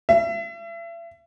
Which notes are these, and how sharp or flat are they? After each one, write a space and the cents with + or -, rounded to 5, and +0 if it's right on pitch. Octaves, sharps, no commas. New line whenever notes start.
E5 +40